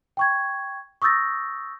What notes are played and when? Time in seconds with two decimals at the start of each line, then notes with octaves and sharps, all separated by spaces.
0.17 G5 C#6 G#6
1.02 C#6 D#6 E6 G6 A6 A#6